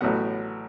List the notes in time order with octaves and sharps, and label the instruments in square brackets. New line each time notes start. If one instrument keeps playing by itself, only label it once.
[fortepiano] A1 A2 F#3 B3 F#5